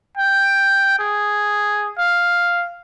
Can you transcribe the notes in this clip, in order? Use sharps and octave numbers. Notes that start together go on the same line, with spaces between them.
G5
G#4
F5